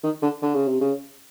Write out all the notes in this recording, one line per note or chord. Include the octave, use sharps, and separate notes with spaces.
D#3
D3
D3
C#3
C3
C#3